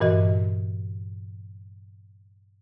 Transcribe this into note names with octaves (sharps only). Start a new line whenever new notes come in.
G2 A#2 E3 F#4 D#5